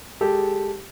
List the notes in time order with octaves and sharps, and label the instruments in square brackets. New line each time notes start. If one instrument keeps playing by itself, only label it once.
[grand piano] G#3 G4 A4